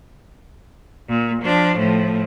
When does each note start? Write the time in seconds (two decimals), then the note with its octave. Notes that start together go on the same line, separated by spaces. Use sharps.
1.09 A#2
1.42 F3 D4
1.78 A2 F3